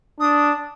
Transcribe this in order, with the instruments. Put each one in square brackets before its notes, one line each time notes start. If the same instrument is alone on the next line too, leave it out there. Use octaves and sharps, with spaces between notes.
[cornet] D4 [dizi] D#6